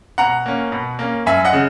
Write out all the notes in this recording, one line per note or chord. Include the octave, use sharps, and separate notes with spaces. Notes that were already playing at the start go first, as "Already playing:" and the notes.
B2 F#5 A#5
A#3 C#4
B2
A#3 C#4
F#2 E5 G#5
D#5 F#5
C#3